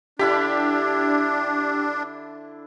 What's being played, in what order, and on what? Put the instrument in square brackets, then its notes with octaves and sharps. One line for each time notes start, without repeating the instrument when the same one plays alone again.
[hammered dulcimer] D3 E4 B5 [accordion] D4 [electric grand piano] G4